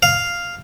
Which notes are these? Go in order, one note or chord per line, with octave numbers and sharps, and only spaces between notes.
F5